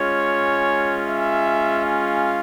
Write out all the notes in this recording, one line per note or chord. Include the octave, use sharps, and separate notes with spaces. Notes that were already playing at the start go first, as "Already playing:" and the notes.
Already playing: G#3 C#4 F4 C#5
E5
F5